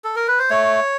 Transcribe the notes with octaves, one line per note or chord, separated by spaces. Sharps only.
A4
A#4
B4
C5
A3 C#5